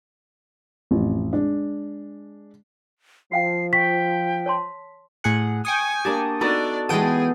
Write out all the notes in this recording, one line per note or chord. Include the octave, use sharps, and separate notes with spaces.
A1 F2
G#3 D4
F3 F#4 F5 G5 C7
G5 C#6 B6
C#5 A5 C6
A2 G#4 F#5
G5 G#5 C#6 D#6
A#3 D4 G4 A5
B3 D4 D#4 F#4 A4 D5
E3 G#3 B3 G#4 A4 G5 D#7